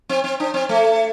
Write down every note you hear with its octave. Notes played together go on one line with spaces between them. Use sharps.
C4
C4
D4
C4
A3